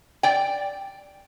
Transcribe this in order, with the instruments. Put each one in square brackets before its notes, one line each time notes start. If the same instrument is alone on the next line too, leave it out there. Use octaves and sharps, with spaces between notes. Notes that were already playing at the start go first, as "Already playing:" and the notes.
[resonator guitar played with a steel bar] D5 G5